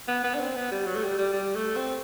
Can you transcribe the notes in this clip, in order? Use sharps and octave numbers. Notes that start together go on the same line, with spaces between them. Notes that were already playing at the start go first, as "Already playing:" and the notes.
B3
B3
D4
C4
B3
G3
F#3
A3
G3
G3
G3
A3
C4